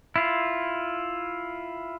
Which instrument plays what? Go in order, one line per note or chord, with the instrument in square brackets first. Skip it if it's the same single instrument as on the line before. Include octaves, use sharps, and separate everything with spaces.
[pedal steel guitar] E4 F4